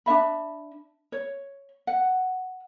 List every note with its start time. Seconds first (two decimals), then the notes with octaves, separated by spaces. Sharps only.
0.06 D4 F#4 E5 B5
1.12 C#5
1.87 F#5